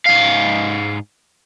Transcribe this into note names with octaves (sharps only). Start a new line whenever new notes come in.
G#2 F5